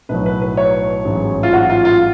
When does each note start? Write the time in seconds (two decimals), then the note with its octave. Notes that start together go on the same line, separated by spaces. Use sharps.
0.09 B1 A2 F#3 B4
0.26 B4
0.42 B4
0.57 C#5
1.05 A1 G#2 F#3
1.43 F4
1.53 F#4
1.70 F4
1.85 F4